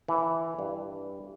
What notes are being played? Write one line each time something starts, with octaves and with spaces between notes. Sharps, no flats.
E3
G2